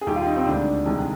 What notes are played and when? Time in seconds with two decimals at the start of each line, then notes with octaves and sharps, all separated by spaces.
0.01 G#4
0.07 D#2 D#3 G3 G4
0.16 F4
0.27 D#4
0.36 C4
0.46 D2 D3 G#3 D4
0.86 C2 C3 D#3 G#3